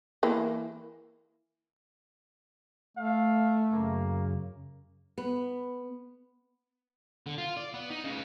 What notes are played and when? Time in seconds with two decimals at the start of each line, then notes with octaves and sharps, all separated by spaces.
0.23 E3 A#3
2.97 A3 F5
3.72 F#2 C#3 A#3
5.18 B3
7.26 D3
7.38 F4
7.57 D5
7.74 B3
7.91 D#4
8.04 C#3 B4